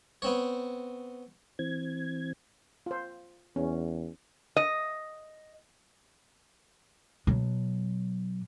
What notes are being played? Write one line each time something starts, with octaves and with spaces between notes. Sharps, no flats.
B3 C4 C#5
E3 C4 G#6
F4 C5
E2 C#4
D#5
B2 F#3